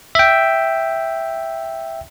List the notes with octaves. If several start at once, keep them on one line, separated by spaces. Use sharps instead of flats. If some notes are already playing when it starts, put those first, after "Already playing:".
E5 G5